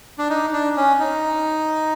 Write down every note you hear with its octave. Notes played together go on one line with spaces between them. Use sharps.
D4
D#4
D4
C#4
D#4